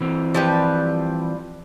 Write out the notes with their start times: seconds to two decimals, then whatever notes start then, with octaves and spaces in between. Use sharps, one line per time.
0.01 E3 C4
0.34 F3 G3 B4